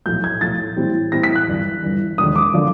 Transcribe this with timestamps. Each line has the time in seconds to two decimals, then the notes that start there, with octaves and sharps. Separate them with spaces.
0.05 B1 A2 F3 A3 G6
0.24 G#6
0.41 B1 A2 F3 A3 A6
0.76 A2 E3 G3 C4 E4
1.12 A2 E3 G3 C4 E4 A#6
1.23 B6
1.35 F#6
1.47 G1 G2 E3
1.83 G1 G2 E3
2.18 E1 D#2 D3 F3 D#6
2.36 D6
2.54 D3 F3